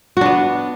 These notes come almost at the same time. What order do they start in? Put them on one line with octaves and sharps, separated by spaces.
F#4 D4 B3